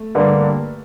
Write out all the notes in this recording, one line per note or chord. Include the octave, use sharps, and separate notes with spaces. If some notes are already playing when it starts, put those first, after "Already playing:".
Already playing: A3
G2 D3 G3 A#3